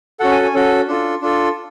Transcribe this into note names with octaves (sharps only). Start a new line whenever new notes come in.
C#4 F#4 A4 F#5
G#5
G#5
C#4 F#4 A4
D4 F4 A4
D4 F4 A4